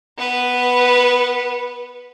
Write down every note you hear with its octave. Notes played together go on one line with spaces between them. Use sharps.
B3 B4